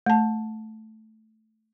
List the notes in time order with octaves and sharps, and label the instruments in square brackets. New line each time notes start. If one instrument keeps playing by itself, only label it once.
[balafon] A3 A5